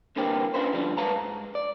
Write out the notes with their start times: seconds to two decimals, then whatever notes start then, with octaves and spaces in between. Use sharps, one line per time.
0.16 C2 D3 E3 A#3 C4 G4
0.54 C#4 D4 F4 B4 C5
0.73 D3 F3 G3
0.97 G#3 B4 F5 A5 A#5
1.16 G#2
1.55 D5